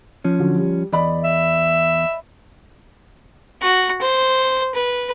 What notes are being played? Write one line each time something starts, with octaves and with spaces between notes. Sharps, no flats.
F3 C#4
D3 F#3
G3
E2 D5 D#5 B5
E5
F#4
C5
B4